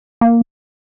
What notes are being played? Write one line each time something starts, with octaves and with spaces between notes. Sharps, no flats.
A#3